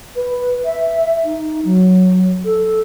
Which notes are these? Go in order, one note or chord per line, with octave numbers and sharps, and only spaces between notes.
B4
E5
D#4
F#3
A4